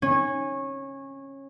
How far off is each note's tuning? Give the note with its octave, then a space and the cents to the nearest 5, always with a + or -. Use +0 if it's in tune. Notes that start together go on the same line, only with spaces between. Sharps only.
C#4 -20